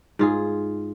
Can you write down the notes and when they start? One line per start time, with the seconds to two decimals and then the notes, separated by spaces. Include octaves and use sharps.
0.19 G#2 F4 G#4